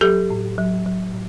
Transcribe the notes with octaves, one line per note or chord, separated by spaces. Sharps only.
F#3 G4 A4
A2
F#3
F#3
A2